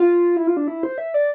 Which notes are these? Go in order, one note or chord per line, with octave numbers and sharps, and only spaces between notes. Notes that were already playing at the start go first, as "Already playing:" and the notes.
Already playing: F4
E4
F4
D4
E4
C5
E5
D5